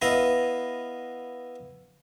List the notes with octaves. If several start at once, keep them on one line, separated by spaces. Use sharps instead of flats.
B3 E4 D#5 F5